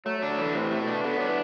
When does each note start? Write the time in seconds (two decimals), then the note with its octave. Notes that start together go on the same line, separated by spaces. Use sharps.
0.05 F#3 A3
0.18 F#3
0.23 D4
0.30 F#3
0.39 D3 E3
0.55 A2 C3
0.71 A3
0.80 B2
0.88 D4
1.04 D3 B3
1.19 F#3 D4
1.28 E3